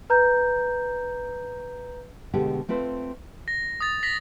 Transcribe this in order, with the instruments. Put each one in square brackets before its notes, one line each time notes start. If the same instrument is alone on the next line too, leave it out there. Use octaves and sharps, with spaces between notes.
[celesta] B4 A#5 G6
[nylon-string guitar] D2 B2 D3 G#3 B3 G4
A3 C4 F4 B4 C5
[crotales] A#6
D#6 A6
A#6 B6 F#7